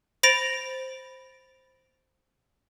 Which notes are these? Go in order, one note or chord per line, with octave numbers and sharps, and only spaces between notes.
C5 B5 A6 A#6 D7 F7